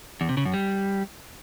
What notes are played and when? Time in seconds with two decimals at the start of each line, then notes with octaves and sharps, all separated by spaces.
0.21 E2
0.29 C3
0.37 C#3
0.45 F#2
0.54 G3